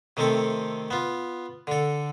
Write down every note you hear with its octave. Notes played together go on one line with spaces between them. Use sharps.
C3 D#3 A3 C4 A4
B3 F4
D3 A4